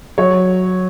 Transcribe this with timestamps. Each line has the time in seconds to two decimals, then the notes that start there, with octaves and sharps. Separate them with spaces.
0.18 F#3 C#5